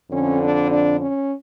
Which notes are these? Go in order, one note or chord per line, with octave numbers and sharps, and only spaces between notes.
F2 D3 C#4
D4
D4
C#4